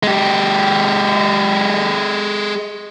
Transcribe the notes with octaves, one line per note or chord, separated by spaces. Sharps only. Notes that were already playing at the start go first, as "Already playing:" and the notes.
G#3 G4